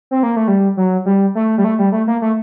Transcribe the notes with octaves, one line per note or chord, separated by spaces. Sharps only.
C4
A#3
A3
G3
F#3
G3
A3
G3
A3
G3
A3
A#3
A3